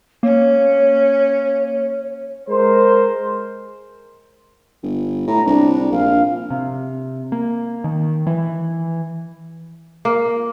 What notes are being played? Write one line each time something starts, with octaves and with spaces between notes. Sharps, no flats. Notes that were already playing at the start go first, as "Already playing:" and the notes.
A#3 C#4 C#5
G#3 A#4 C5
G1
A2 A#5
C2 D4
A#1 F5
C3
A#3
D#3
E3
A#3